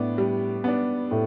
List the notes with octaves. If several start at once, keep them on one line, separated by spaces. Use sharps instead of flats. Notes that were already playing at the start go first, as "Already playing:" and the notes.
Already playing: A2 B3 D4
G3
B3 D4
A2